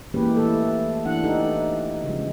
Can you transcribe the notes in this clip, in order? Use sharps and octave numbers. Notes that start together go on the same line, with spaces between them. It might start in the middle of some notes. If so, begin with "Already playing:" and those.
E3 G#3 A#3 C#4 G4 B4
E3 A3 A4
E3 D4 F#5
A3 D#4 G4 A4
C#3 F3 G#3